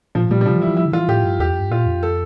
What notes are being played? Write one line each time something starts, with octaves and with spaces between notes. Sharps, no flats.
A#2 F3
A#2 G3
G3
C3 F3
E3
E4
E3
F3 E4
D3
E3 F4
A2 G4
G2
E2 G4
F2
G2
A#2 F4
F2
A4